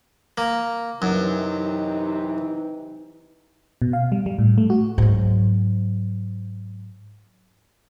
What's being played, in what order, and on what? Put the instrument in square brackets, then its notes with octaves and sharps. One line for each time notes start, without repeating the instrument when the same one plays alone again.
[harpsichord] A#3
[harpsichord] F#2 [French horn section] C3 E3 D#4
[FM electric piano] B2
F5
G3
G3
A2
A3
F#4
[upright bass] G#2 F#3